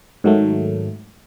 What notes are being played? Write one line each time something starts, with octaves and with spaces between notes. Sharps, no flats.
G#2 D#3 F#3 G#3 A3